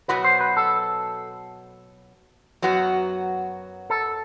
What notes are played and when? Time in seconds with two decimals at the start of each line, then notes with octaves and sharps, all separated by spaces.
0.08 B2 F#3 B3 F#4 B4
0.24 C5
0.41 B4
0.57 A4
2.62 F#2 F#3 B3 F#4
3.90 A4